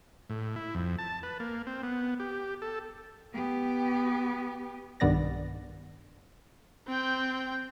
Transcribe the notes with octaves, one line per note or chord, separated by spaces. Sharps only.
A2
E4
F2
A5
B4
A#3
C4
B3
G4
A4
B3 G4
B1 G2 D#3 B3 D5 A#6
C4 G5